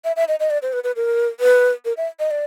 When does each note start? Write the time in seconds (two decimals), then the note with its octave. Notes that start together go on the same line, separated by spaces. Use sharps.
0.05 E5
0.16 E5
0.28 D#5
0.40 D#5
0.50 D5
0.62 C5
0.73 B4
0.84 B4
0.96 A#4
1.40 B4
1.85 A#4
1.97 E5
2.20 D#5
2.31 D5